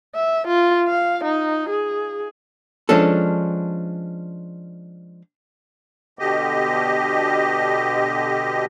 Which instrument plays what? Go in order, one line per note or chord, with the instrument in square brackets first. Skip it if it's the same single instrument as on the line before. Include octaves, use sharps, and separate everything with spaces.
[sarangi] E5
F4
F5
D#4
G#4
[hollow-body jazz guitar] F3 G#3 C#4 D4 A4
[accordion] B2 D3 G4 D#5